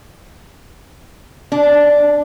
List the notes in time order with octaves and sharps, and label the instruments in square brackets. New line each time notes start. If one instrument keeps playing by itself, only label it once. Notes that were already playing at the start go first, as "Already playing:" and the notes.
[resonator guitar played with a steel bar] D4